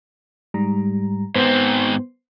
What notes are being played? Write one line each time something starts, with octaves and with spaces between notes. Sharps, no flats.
G#2 G3 A#5
G#2 B3 C4 C5